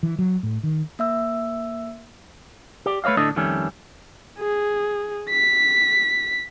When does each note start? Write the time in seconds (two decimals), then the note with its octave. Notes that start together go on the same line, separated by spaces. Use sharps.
0.03 E3
0.19 F#3
0.43 A2
0.63 D#3
0.99 A#3 E5 E6
2.86 G4 D5
3.04 A3 B4 C#5 D#5 F5
3.17 D2 A2 D4 A4 D#5
3.36 F2 D#3 G3 A3 C#4
4.39 G#4
5.30 B6